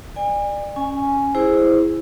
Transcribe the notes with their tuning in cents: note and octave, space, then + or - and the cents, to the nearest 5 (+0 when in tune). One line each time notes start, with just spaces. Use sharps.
D5 +30 G#5 -35
C#4 +0 G#5 +0
E4 +0 G#4 -15 C5 +0